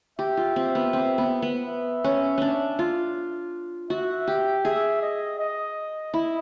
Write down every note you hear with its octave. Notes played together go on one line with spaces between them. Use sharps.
G4 E5
F4
C4
B3
C4
B3
B3
E5
C#4
C#4 D4
F4
F#4 E5
G4
G#4 E5
D#5
D#5
E4